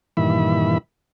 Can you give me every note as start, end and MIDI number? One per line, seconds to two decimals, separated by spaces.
0.17 0.78 43
0.17 0.78 46
0.17 0.78 51
0.17 0.78 52
0.17 0.78 76
0.17 0.78 83